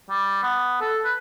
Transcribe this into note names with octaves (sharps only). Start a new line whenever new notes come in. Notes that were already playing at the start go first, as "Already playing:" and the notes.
G3
B3
A4
B4